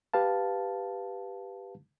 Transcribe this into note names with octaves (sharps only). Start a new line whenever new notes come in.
G4 B4 F5 A5